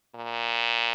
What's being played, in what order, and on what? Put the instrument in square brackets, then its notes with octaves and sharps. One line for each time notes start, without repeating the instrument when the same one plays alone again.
[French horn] A#2